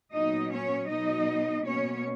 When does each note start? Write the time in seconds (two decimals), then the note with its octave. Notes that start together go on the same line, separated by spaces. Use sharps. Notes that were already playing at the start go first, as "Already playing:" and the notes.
0.13 A#2 F#3 B3 D#4 D#5
0.51 C#4 C#5
0.88 B2 F#3 B3 D#4 D#5
1.65 B2 A#3 C#4 C#5